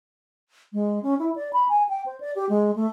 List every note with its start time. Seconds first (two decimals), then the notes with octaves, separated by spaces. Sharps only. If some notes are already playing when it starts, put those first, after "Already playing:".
0.73 G#3
1.03 C#4
1.19 E4
1.36 D5
1.53 B5
1.69 G#5
1.89 G5
2.06 C5
2.20 D5
2.36 G4
2.49 G#3
2.76 A3